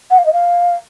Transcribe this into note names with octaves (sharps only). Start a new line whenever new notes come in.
F#5
F5
D#5
F5